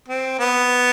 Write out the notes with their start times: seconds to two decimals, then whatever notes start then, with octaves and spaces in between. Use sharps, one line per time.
0.08 C4
0.39 B3